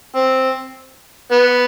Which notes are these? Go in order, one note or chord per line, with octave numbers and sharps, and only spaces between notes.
C4
B3